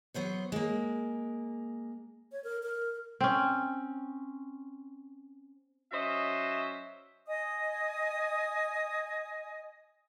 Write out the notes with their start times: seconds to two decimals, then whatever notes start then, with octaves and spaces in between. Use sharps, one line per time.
0.14 F#3 B3 C5 C#5
0.52 G#3 A#3
2.32 C#5
2.44 A#4
2.63 A#4
3.21 C4 C#4
5.93 F#3 C#4 C5 D#5 E5
7.28 D#5 G#5 D#6